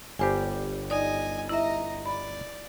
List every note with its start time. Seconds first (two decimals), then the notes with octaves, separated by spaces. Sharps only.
0.19 G1 G3 G4 C5 G#5
0.90 D#4 D5 D#5 G#5
1.49 E4 D#5 E5 A#5
2.05 D5 B5